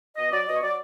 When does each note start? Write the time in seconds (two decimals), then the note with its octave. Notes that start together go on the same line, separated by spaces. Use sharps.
0.17 B2 D#5
0.31 F#3 D5
0.48 B2 D#5
0.56 C#5
0.62 F#3 D5